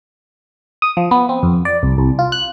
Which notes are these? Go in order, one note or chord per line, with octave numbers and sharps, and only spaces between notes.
D#6
F3
B3
C4
F2
D5
C2
C2
F4
F#6